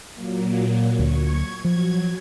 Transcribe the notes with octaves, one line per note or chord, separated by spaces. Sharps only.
A#2 F#3 A#3
D2 C#6 G#6
F3 F#3 G#6